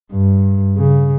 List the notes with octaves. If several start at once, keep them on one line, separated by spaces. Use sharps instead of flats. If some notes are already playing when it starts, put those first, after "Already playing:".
G2
C#3